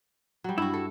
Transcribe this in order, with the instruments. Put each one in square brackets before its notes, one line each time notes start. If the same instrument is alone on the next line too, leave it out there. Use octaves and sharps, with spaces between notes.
[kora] F#3 G3
[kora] G2 [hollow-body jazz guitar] E4 F#4
[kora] A4